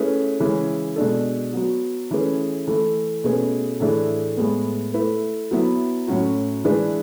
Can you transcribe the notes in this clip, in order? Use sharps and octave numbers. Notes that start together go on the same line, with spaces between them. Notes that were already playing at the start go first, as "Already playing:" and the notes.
Already playing: A3 C#4 E4 G#4 B4
C#3 E3 G#3 C#4 G#4
B2 G#3 D4 A4
F#3 B3 F#4
E3 A3 C#4 G#4 B4
E3 A3 E4 A4
B2 A3 C#4 G#4 B4
A2 E3 A3 D4 G#4
A2 G#3 B3
A3 E4 B4
F#3 B3 E4
A2 F#3 C#4 F#4
E3 G#3 D4 G#4 B4